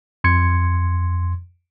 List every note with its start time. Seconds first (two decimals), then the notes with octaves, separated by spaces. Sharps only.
0.24 F2 C6 G#6 C#7